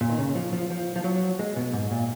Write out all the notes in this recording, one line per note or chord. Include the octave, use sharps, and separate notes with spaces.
A#2
D#3
C#3
F3
F3
F3
F3
F#3
G#3
B2
G#2
A#2